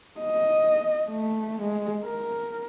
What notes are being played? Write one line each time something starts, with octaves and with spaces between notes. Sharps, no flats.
D#5
A3
G#3
A#4